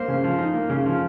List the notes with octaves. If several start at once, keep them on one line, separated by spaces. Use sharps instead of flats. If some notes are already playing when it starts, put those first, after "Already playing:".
Already playing: A#3 C5
C#3
F3
D#4
A#3
C#3
F3